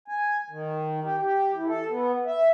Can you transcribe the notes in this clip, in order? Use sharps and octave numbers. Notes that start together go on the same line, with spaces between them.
G#5
D#3
G4
G4
E3
A4
B3
E5